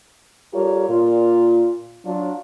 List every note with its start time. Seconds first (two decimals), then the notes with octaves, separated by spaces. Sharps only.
0.54 G3 F4 G4 A4 A#4 C#5
0.89 A#2 F4
2.05 F#3 D4 F4